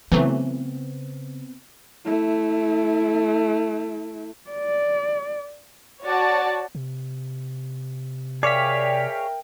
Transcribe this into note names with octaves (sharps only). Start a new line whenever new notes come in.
C#3 E3 F#3 A3 B3 C4
A3 E4
D5
F#4 C#5 D5 F#5 A5
C3
G#4 A#4 C#5 D5 E5 F5 G5 B6